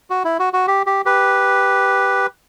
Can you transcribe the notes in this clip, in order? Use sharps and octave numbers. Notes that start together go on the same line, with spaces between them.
F#4
E4
F#4
F#4
G4
G4
G4 B4